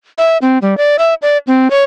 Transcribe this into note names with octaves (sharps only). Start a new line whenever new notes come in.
E5
C4
G3
D5
E5
D5
C4
C#5